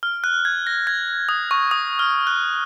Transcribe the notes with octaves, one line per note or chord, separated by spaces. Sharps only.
F6
F#6
G#6
A#6
G#6
D#6
C#6
D#6
F6
F#6